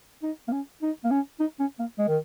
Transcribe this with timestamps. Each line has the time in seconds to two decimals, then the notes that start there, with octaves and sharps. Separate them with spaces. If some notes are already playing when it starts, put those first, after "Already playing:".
0.23 D#4
0.48 A#3
0.52 C#4
0.82 D#4
1.04 A#3
1.11 C#4
1.40 D#4
1.60 C#4
1.79 A#3
1.98 G#3
2.08 D#3